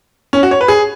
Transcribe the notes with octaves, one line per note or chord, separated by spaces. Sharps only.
C#4
F#4
C#5
B4
G#4